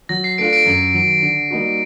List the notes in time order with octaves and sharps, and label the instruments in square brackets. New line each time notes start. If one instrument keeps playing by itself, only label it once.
[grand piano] F#3 [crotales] A#6
[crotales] C7
[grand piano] A3 D4 F4 [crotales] C7 D7
[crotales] C7 D7
[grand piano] F#2
D#3 F#3
D3
G3 A#3 D#4 F#4